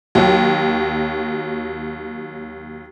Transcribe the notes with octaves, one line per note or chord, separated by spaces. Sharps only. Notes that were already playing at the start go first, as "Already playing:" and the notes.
D#2 F#3